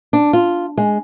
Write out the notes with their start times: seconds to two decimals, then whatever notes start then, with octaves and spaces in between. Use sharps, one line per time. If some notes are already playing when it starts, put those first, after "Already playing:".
0.13 D4
0.33 F4
0.78 G#3